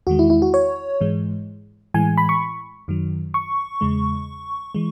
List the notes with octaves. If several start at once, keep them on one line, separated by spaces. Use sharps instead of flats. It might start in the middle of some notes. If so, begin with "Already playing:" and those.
E2 D#3 G#3 F#4
E4
E4
F#4
C#5
G#2 E3 G#3
A2 E3 G#3 G#5
B5
C#6
F#2 D#3 F#3
C#6
E2 C#3 G#3
E3 G#3